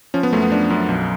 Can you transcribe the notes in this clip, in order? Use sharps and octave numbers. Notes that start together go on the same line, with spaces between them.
F3 C#4
B3
F#2 A3
B3
F3 D4
F#2
B1